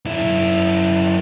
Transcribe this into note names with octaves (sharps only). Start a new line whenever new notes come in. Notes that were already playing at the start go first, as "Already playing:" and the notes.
F#2 E4